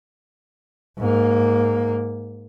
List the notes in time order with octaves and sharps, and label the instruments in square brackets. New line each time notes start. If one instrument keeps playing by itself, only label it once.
[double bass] G#2 A#3